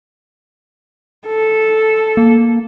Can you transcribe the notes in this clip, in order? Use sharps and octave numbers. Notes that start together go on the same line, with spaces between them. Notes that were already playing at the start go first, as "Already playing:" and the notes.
A4
A#3